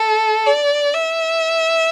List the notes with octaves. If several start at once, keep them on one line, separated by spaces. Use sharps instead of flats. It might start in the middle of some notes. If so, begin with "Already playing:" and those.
Already playing: A4
D5
E5